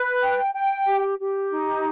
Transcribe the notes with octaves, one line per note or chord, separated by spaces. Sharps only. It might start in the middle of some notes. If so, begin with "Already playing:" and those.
Already playing: B4
G5
G5
G4
G4
D#4